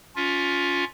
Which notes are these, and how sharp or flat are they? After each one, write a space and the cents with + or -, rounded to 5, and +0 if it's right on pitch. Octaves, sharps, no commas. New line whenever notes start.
C#4 +25 F4 +15